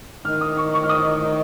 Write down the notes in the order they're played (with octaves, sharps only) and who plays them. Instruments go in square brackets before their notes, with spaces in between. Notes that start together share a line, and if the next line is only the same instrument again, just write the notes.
[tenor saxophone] D#3 [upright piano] F6
[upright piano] D#6
C#6
C#6
F6
D#6
D#5